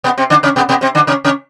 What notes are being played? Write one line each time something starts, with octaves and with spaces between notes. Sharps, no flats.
B2 B3
C3 C4
D3 D4
C#3 C#4
B2 B3
B2 B3
C3 C4
D3 D4
C#3 C#4
C#3 C#4